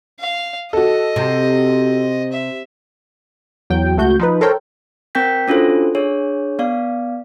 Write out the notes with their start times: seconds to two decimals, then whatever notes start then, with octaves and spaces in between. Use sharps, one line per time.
0.20 F5
0.73 F#4 A4 D#5
1.16 C3
2.32 E5
3.70 E2 F#3 G5
3.97 C#2 A3 F#4 G6
4.19 F3 D#4 B4
4.41 A4 A#4 C5 C#5 G5
5.15 C4 A#4 G5 G6 B6
5.48 C#4 D4 F4 F#4 A4 C5
5.95 D4 G#4 C#5
6.59 B3 D5 F5